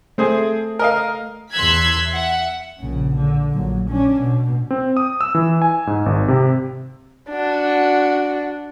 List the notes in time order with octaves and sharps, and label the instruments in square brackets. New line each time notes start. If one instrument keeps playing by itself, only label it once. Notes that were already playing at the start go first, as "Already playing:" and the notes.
[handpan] A3 [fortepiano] C4 G#4 C5
[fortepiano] A#4 D#5 F5
[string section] E2 C6 E6 F#6 G#6 B6
E5 F#5
[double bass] A#1 C#3
D3
A#1 F#3
C#4 D4
B2
[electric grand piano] C4
D#6
E6
E3
G#5
G#2
G#1
C3
[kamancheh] D4 F#4